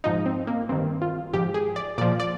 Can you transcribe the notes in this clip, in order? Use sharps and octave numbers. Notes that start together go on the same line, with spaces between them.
G#2 F3 D#4
C4
A#3
G2 D#3 C4
F4
G#2 F3 G4
G#4
D5
A#2 F3 D5
D5